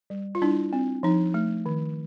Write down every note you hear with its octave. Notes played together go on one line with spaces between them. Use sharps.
G3
F4
G3 D4 E4
C4
F3 D#4
A3
D#3